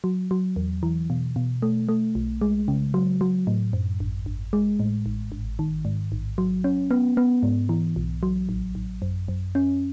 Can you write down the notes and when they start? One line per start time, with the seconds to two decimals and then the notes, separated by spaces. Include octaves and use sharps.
0.04 F#3
0.31 F#3
0.56 E2
0.83 E3
1.10 B2
1.36 B2
1.62 A3
1.89 A3
2.15 B1
2.41 G#3
2.68 C#3
2.94 F#3
3.21 F#3
3.47 A2
3.73 F#2
4.00 G#1
4.26 G#1
4.53 G#3
4.80 A2
5.06 A1
5.32 G#1
5.59 D#3
5.85 G#2
6.12 A1
6.38 F#3
6.64 C#4
6.91 B3
7.17 B3
7.43 G#2
7.69 E3
7.96 B1
8.23 F#3
8.49 A1
8.75 A1
9.02 F#2
9.28 F#2
9.55 C#4